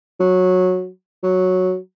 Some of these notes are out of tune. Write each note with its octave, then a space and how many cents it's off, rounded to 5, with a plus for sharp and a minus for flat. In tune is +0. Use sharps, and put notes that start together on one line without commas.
F#3 -15
F#3 -5